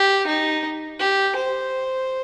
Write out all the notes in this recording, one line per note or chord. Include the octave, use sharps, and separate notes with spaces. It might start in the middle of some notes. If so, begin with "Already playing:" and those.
Already playing: G4
D#4
G4
C5